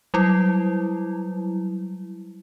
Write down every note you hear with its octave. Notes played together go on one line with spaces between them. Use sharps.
F#3 G3 E4